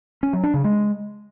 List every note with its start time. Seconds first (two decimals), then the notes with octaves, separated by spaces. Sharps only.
0.23 C#4
0.33 F#3
0.44 D4
0.54 C#3
0.64 G#3